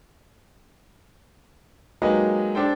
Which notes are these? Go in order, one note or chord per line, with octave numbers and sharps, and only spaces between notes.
F#3 G#3 A#3 D#4 G4 B4
D4 G4 A4 C5 G5